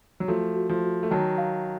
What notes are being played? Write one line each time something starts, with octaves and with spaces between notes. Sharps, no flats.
F#3
F3 A3 F#4
F#4
F3 A3
F#4
A3
D#3 F#3 A5
F5